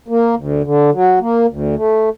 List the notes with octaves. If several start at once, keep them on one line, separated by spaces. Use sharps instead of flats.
A#3
D2
D3
F#3
A#3
D2
A3